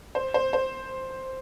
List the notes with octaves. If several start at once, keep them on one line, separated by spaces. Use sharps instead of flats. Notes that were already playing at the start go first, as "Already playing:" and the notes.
C5
C5
C5